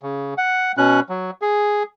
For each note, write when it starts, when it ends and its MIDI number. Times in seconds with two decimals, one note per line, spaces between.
0.03 0.34 49
0.38 0.72 78
0.77 1.00 47
0.77 1.00 61
0.77 1.00 90
1.09 1.31 54
1.42 1.83 68